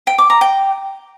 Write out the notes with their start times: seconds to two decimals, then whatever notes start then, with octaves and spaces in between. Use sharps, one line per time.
0.07 G5
0.18 D6
0.30 A#5
0.41 G5